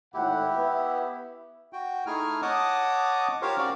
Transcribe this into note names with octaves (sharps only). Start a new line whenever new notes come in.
G#1 A2 E4 G4 F#5
B3 E5
F#4 G5
A3 D#4 E4 G#4 G#5 F6
C#5 D#5 F#5 A5 D6 D#6
F4 G4 A#4 C5 C#5 F5
C#4 F#4 A#4 D5 F5